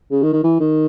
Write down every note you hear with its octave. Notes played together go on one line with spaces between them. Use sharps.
C#3
D#3
D#3
E3
D#3